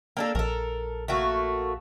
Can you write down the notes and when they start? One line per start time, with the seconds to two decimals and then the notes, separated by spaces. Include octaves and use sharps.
0.17 A#3 D4 A4
0.35 A#1 A4 A#4
1.08 A3 A#3 F#4